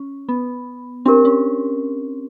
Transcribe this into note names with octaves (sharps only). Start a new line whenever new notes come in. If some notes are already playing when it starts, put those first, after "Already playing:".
Already playing: C#4
B3
C4 D4 G4 A#4
C#4